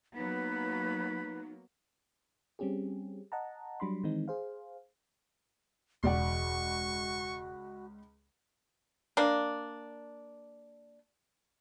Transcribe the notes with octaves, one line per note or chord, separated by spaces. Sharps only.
F#3 A#3 B3 D#4 B4 B5
G3 C4 C#4 G4 G#4
D#5 F#5 A5 A#5
F#3 G3 D4 B5 C6
D#3 E3 G#3 C4 D#4
G#4 C5 F5
E1 C#2 F#4 D5 F#5 C#6
A#3 D4